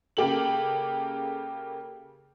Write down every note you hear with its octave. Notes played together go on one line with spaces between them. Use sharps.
C#3 A#3 G4 A4 F#7